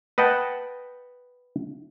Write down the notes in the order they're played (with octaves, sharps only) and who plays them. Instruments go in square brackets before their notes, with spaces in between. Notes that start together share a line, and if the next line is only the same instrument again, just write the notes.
[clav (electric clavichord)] B4 D#5 F#5 G5 A5